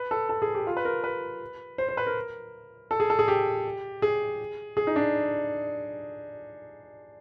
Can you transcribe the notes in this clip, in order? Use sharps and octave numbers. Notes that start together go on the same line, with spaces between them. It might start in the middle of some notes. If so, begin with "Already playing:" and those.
Already playing: B4
A4
A4
G#4
G4
F4
B4
A#4
B4
C5
C5
B4
A#4
A4
G#4
A4
G#4
G4
G#4
G#4
D#4
D4